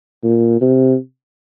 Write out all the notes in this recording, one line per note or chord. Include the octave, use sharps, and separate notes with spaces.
A#2
C3